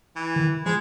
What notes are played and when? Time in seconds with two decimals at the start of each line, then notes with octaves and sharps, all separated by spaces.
0.16 E3
0.36 D#3
0.66 F3 G#3 G6